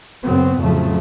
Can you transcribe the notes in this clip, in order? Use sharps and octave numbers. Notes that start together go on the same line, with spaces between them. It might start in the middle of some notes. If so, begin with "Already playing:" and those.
F#2 C#3 B3 C4
F2 A2 C#3 F3 F#3 A3